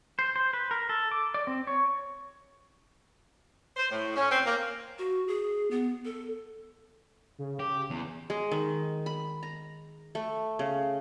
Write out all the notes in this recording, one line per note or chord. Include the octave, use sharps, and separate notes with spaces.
C5
C5
B4
A#4
A4
D6
D5
C4
C#5
C5
A2
C#4
C4
A#3
F#4
G#4
B3
A4
C#3
G4
E2
G#3
D#3
B5
A#5
A3
C#3